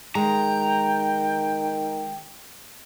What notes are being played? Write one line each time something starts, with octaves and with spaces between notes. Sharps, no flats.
D#3 G#3 G5 A#5